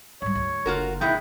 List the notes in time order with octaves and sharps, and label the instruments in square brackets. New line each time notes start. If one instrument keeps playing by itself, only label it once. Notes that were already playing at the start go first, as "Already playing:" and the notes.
[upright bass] G#2 G3 [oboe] C#5
[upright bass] D2
[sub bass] F#1 [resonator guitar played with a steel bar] F4 F#4 A#4
[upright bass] C3 [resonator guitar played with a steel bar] D#3 G#3 E4 [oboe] G5